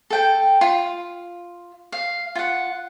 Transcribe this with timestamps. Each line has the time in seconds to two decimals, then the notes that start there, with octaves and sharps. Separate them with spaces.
0.10 A4 G5
0.61 F4
1.92 F5
2.35 F4 F#5